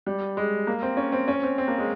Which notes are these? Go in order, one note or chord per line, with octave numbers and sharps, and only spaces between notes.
G3
G#3
A#3
C4
C#4
C4
C#4
C4
C4
A#3
G#3